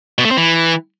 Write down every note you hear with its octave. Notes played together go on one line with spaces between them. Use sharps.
B2
A3
C4
E3